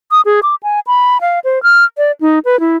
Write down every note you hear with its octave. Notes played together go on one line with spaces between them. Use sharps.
D#6
G#4
D6
G#5
B5
F5
C5
F6
D5
D#4
B4
E4